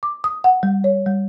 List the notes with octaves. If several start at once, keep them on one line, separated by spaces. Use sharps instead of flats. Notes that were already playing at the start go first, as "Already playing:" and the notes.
D6
D#6
F#5
G3
C#5
G3